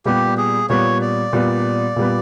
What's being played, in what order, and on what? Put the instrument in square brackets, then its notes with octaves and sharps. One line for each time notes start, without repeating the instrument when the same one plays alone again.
[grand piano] A#2 G3 B3 [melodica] G4
[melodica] G#4
[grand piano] A#2 G3 B3 [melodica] C#5
[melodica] D5
[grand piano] A#2 G3 B3
A#2 G3 B3